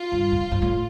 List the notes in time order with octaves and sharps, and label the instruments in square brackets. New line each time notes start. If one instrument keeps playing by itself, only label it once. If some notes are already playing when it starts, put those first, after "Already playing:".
Already playing: [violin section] F4
[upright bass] G2
F2
G2
A2